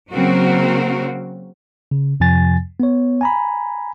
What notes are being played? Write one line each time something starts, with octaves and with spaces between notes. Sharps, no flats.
C#3 F#3 A#3 C4 F#4 A#4
C#3
F2 C3 F3 G#5 A6
B3 C#5
G#5 A#5 B5